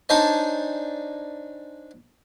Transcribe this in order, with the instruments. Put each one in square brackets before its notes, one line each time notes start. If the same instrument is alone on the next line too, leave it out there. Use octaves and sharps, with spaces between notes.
[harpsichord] D4 D#4 C5 C#5 G#5 A5